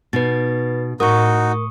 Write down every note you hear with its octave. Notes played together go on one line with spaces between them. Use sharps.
B2 D#4 B4 A6
A2 D#4 F#4 A#4 C#6 D#6